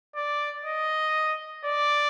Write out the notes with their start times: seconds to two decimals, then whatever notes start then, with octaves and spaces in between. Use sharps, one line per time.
0.15 D5
0.65 D#5
1.65 D5